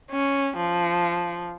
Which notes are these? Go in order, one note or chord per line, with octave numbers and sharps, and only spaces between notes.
C#4
F3